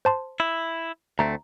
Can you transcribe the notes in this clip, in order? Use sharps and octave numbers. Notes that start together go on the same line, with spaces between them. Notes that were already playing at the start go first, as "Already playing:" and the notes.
C5 A5 C6
E4
D2 A3 C4 A#5